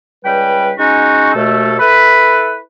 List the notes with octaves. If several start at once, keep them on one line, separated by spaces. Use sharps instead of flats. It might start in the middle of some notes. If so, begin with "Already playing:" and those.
C#2 G3 B4 G5
G#3 C#4 D#4 F#4
D#2 B2 A3 A4
E4 A4 B4